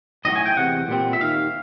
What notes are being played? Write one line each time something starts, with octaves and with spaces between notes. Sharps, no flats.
B1 A2 F#3 A3 D#5
G#5
G5
E2 C3 F#5
A#2 G3 C4
E5
D#2 D#3 F5